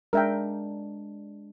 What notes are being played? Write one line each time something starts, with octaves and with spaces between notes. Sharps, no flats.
G#3 D4 A#4 E5 G5